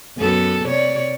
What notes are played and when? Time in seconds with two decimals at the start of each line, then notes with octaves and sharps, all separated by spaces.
0.17 F#2 B3 A4
0.66 C3 C#5 D5